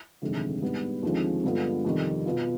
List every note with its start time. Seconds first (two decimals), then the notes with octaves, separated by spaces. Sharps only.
0.22 G1 F2 C3 D#3 G#3
0.62 G#2 G3 B3
1.03 D#2 D3 F3 G#3 C4
1.44 G2 D3 G#3 B3 F4
1.85 F2 C3 D#3 G3
2.25 B2 B3 F4